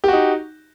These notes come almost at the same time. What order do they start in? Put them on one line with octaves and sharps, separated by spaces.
G4 F#4 D#4